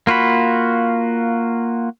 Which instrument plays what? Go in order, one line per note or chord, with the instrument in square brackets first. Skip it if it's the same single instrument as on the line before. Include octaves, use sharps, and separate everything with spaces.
[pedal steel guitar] A#3 F4 F#4 B5